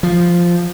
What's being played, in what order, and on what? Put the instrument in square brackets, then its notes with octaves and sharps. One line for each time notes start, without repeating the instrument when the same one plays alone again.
[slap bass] F3